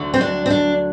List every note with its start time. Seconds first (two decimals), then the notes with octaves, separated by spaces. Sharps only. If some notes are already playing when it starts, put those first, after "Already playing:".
Already playing: D2 D3 F#3
0.14 C4
0.21 D4
0.46 C4
0.50 D4